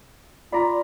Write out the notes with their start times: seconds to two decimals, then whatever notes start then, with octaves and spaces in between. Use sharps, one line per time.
0.52 F4 D5 A#5 B5